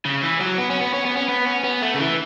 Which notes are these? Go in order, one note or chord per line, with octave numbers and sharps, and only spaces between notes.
C#3
E3
F#3
B3
C#4
B3
C#4
B3
C#4
B3
C#4
B3
A3
C#3
E3